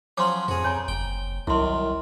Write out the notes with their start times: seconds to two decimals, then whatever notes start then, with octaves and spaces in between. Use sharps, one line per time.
0.17 F3 F#3 C#4 C6 D6
0.48 F2 F#4 G#4
0.64 C#5 G#5 A#5
0.88 F#1 G5
1.47 C2 F#2 D#3 E4 C6